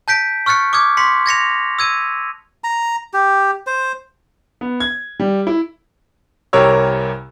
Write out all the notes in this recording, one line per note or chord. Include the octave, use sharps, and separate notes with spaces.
A5 G6 B6 D7
C#6 F6 F#6 A6 C#7
D6 D#6 F6 G#6
C6 B6 C#7
G#6 A#6 C#7 F7
E6 G#6 D#7
A#5
G4
C5
B3
G#6
G3
E4
C2 C3 G4 A#4 C#5 E6